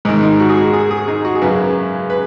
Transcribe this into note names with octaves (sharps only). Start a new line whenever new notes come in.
G#2 D#3 D#4
D#4
F#4
G#4
F#4
G#4
G#4
D#4
F#4
G#4
F#2 C#3 B4
B4